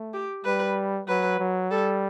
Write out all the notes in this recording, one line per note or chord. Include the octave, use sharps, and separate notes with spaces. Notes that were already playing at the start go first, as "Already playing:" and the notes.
Already playing: A3
G4
G3 B4
F#3 B4
F#3
G3 A4